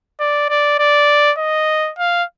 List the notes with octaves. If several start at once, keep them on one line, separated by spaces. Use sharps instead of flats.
D5
D5
D5
D#5
F5